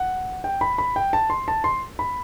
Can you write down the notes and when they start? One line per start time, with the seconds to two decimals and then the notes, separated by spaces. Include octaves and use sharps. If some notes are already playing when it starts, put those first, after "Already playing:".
Already playing: F#5
0.44 G5
0.61 B5
0.78 B5
0.96 G5
1.13 A5
1.30 C6
1.48 A5
1.64 C6
1.99 B5